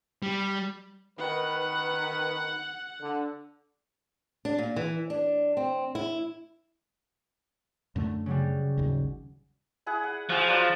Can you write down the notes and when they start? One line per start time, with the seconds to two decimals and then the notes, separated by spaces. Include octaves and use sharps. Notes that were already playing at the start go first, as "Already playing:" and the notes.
0.23 G3
1.19 D#3 B4 F#5
3.02 D3
4.45 D4
4.58 A#2
4.76 E3
5.10 D4
5.57 C4
5.95 E4
7.96 F#2 D3 A3
8.26 C#3 F#3 G3
8.77 G#1 D#2
9.86 E4 G#4 F#5
10.04 F#5
10.30 F3 F#4 G#4
10.48 F#3 F4 D5